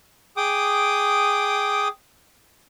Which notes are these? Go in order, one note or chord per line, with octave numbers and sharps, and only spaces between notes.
G#4 G5 D6 D#6